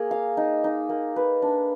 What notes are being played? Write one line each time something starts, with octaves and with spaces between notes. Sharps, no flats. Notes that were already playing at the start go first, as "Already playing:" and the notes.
Already playing: A#3 G#4
F5
D#4
D#4
A#3
B4
D4